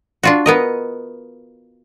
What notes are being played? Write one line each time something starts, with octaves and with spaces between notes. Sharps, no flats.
D4 F4 F#4
B3 A#4 D#5